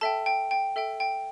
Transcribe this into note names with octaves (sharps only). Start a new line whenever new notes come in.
A4 E5 G5 A5
G5
G5
A4 E5 G5
G5